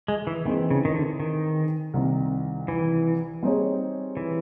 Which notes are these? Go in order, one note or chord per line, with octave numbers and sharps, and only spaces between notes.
G#3
E3
D#3 E3 G#3 C4 D#4
C#3
D#3
D3
D#3
C2 C3 D#3
E3
G3 C4 D#4 G#4 C#5
E3